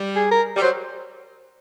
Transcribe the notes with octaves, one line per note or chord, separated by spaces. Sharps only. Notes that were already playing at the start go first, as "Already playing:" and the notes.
Already playing: G3
G#4
A#4
G3
F#3 C5